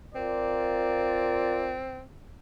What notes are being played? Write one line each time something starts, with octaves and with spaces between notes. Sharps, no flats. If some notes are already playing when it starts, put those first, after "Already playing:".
C4 F4 A#4 D5